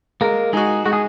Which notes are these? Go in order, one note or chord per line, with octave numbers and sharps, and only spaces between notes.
G#3 A#3 A#4
G#3 D#4 F#4 G#4
G#3 F#4
G#4